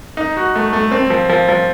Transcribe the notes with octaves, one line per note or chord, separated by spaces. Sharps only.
D#4
F#4
A3
A3
C4
F3
F3
F3